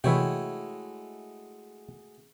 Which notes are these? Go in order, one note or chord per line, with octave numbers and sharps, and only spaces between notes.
C3 E3 G#3 A3 E4 F#4 C#5 G5